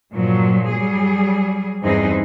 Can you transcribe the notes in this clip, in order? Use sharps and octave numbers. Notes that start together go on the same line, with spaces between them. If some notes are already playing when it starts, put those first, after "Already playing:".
G2 A#2 F3 F#3
F#3 G3 G#4
E2 G2 C4 D#4 G#4 B4